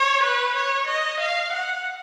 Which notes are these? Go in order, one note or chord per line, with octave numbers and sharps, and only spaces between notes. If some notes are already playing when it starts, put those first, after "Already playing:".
Already playing: C#5
B4
C#5
D#5
F5
F#5